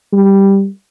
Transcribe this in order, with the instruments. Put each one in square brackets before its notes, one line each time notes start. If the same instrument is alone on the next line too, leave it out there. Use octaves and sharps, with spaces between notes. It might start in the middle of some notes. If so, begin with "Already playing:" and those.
[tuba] G3